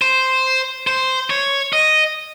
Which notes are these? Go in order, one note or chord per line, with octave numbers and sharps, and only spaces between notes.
C5
C5
C#5
D#5